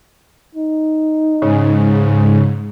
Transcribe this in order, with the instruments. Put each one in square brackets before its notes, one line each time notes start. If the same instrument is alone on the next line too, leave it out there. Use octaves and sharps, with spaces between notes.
[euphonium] D#4
[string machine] G#2 [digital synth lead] C#3